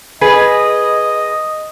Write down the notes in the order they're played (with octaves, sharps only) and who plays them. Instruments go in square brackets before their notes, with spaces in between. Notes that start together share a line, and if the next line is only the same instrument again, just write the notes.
[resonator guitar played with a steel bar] G#4 B4 [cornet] D#5